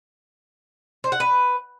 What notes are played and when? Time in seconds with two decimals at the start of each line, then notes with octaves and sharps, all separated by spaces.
1.04 C5
1.12 F#5
1.20 B4